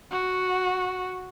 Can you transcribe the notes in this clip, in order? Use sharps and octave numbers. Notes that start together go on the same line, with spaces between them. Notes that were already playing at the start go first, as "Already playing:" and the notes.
F#4